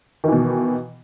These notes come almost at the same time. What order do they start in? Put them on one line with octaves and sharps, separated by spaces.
D#3 E3 B2